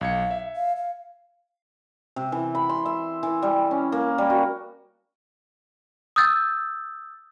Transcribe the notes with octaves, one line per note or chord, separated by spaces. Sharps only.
B1 F5 G#6 C#7
E5
F5
F5
C3
E3
B5
C6
E5
E3
G3
C#4
A#3
G3
F#4
D#6 E6 G6 A6